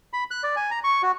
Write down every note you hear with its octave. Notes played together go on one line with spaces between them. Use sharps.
B5
F#6
D5
G#5
A#5
C#6
F#4